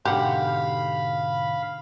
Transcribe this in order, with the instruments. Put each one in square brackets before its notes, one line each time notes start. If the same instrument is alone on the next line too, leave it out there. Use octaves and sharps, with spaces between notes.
[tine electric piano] G#2 B2 D3 [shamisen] G4 F#5 [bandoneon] F5 B5